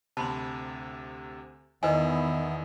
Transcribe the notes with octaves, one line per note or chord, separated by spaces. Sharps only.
D2 C3 A5 B5 C6
E2 D#3 B3 E4 B4 D#5 G#5